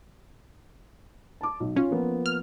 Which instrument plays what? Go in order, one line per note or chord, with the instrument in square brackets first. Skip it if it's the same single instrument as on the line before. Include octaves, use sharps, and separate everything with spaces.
[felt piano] A5 D6
B1
[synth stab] C#4 [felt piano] F4
[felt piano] F3 A#3 B3
[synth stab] F6